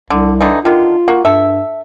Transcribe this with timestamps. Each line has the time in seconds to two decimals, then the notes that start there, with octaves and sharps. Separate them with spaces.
0.10 C2 D3
0.41 D3 E3 D#4
0.65 D3 D#3 F4
1.08 A#3 F#4
1.25 G2 A4 E5